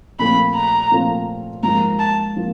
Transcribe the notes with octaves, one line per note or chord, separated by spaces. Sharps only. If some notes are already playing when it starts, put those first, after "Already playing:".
A#2 F3 A3 C4 F4 B5
A#5
A#2 F3 A3 C4 F4
G#2 F3 A#3 A#5
A5
F3 A#3